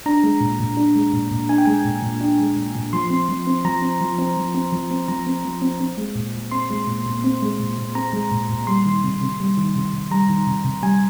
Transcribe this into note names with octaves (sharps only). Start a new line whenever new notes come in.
D4 A#5
G#3
A#2
A#2
D4
G#3
A#2
A#2
D4 G#5
G5
G#3 G#5
A#2
A#2
D4
G#3
A#2
A#2
F3 C6
C4
F3
C4
F3 A#5
C4
F3
C4
F3
C4
F3
C4
F3 A#5
C4
F3
C4
C4
G#3
A#2
A#2
C4 C6
G#3
A#2
A#2
C4
G#3
A#2
A#2
C4 A#5
G#3
A#2
A#2
G3 C6
D#3
C3
C3
G3
D#3
C3
C3
G3 A#5
D#3
C3
C3
G3 G#5